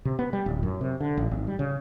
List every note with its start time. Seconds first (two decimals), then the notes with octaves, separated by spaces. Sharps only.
0.05 C3
0.19 B3
0.33 G3
0.46 D1
0.63 F#2
0.81 C3
1.01 D3
1.17 A1
1.31 G#1
1.47 G3
1.59 C#3